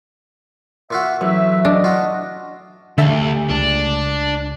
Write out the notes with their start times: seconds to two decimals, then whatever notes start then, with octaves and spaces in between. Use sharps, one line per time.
0.91 A#2 F4 F#4 E5
1.21 A1 F#3 E5
1.65 D4 D#5
1.84 F4 F#4
2.98 D2 D3 A3 G4 E5 F5 A5
3.50 C#2 D4